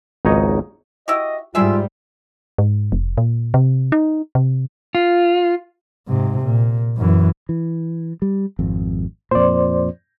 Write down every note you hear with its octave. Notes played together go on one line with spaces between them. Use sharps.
G#1 C#2 D#4 C#5 D#5
E4 F#4 G4 D#5
G#2 G3 E4 F4 G#4 E5
G#2
F1
A#2
C3
D#4
C3
F4
G#2 C3
A#2
F#2 E3
E3
G3
G#1 F2
F2 A#2 C5 D5